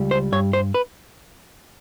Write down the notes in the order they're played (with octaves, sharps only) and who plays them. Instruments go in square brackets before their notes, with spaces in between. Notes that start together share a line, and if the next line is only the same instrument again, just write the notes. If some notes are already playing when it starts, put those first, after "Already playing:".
Already playing: [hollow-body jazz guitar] C#2 G3
C5
G2 C#5
C5
B4